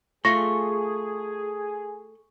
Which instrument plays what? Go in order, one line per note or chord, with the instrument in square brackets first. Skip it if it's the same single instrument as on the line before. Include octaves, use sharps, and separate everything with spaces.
[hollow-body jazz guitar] A3 F4 [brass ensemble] G#4 [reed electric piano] C#6 [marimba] A#6